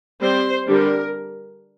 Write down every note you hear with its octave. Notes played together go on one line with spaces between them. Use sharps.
G3 C4 C5
D3 G3 D4 A#4